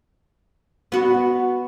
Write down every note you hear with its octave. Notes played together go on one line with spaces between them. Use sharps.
B3 F#4